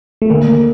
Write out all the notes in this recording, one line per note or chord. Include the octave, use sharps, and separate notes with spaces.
A3
D2 A#3